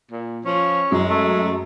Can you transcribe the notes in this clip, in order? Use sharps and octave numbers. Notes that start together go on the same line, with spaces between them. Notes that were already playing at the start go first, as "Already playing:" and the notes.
A#2
F3 C#4
F#2 F#3 G#3
A3